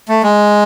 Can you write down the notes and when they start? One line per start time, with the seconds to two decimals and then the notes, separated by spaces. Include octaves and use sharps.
0.08 A3
0.23 G#3